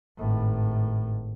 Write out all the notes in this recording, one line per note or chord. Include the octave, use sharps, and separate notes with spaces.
G#1 A2